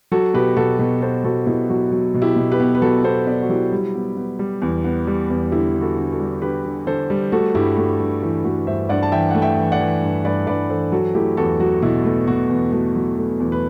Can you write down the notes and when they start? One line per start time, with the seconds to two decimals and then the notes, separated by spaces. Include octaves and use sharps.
0.12 F#3 F#4 A4
0.34 B2 G4 B4
0.56 B2 F#4 A4
0.79 B2 G4 B4
1.02 B3 A4 C5
1.24 B2 F#4 A4
1.47 B2 E4 G4
1.69 F#3 F#4
1.92 F#3
2.14 B2
2.22 E4 G4
2.36 B2
2.52 G4 B4
2.60 B3
2.75 B4
2.82 F#3 F#4 A4
3.04 B3 A4 C5
3.27 B3 B4 D5
3.42 F#4
3.49 F#3 E4 G4
3.72 G3
3.95 B3
4.17 B3
4.39 G3
4.62 E2
4.84 B3
5.07 G3
5.30 E2
5.52 D3 E4 G4
5.75 D3
5.81 F#4 A4
5.97 D3
6.12 F#4 A4
6.20 G3
6.42 D3 G4 B4
6.65 D3
6.87 D3 A4 C5
7.10 G3
7.32 A3 F#4 A4
7.55 G2 E4 G4
7.77 A3 F#4
8.00 G2
8.22 E3 E4
8.44 A3 F#4
8.67 G2 C5 E5
8.89 G2 D5 F#5
9.03 A5
9.12 E3 E5 G5
9.31 A3 F#5
9.42 E5 G5
9.57 E3
9.72 D5 F#5
9.80 E3
10.02 G2
10.25 G2 B4 D5
10.47 G2 B4 D5
10.70 E3 A4 C5
10.92 F#3 F#4 A4
11.15 A3 E4 G4
11.37 E2 F#4 A4
11.60 F#3 F#4
11.82 B2 E4
12.05 A3
12.27 B2 F#4
12.50 E2
12.72 A3 F#4
12.95 F#3
13.03 F#4
13.17 A3
13.40 E2
13.52 B4